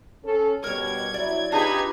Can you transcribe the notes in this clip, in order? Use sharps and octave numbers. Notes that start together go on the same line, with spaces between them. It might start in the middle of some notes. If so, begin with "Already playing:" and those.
C#4 A4
B2 G3 A#4 C#5 G#6
F#3 E4 D5
D4 D#4 F4 G4 G#4 B4 A#5 G#6